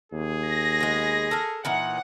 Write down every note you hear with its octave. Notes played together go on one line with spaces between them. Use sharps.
D#2 G#4
A#6
G#3 B3
A4 A#4
A#2 E3 D#4 F#5